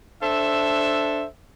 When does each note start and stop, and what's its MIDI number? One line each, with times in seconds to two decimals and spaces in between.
0.23 1.26 62
0.23 1.26 69
0.23 1.26 72
0.23 1.26 76